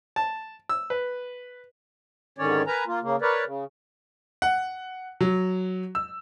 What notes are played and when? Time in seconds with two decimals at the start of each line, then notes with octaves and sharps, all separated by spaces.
0.16 A5
0.69 E6
0.90 B4
2.38 G#2 D3 D#3 C#4 C#5 D5
2.67 A#4 B4 G#5 A#5
2.87 A#3 F4
3.02 C#3 A#3
3.22 A#4 B4 C#5 D5
3.44 C#3
4.42 F#5
5.21 F#3
5.95 E6